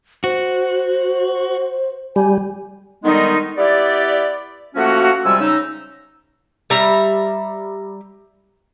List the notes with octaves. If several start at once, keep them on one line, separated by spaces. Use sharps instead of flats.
F#4 C5
G3 G#5
D3 D#3 G3 G#3 B3 D#4
B3 E4 G4 D5
F3 A3 A#3 C#4 F#4
C3 F3 G3 G#3 G#5 E6
C#3 D#4 E6
G3 E5 A#5